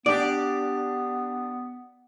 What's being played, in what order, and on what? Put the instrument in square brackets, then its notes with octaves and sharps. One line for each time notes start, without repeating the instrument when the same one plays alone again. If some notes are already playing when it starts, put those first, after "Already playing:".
[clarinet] B3 [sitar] D4 G4 [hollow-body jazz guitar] D5